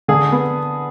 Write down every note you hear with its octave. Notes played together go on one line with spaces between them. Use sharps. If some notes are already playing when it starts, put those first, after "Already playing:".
D3 G#4
B3